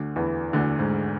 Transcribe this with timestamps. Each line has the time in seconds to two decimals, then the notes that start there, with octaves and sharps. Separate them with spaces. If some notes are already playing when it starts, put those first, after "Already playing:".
Already playing: D2 D3
0.16 E2 E3
0.53 D2 D3
0.79 G#2